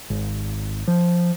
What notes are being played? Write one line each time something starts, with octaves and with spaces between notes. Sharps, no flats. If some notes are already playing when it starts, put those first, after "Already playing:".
G#1
F3